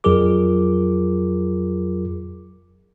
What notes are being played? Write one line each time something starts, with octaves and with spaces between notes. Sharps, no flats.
F2 F#3 F4 G#4 A#4 D6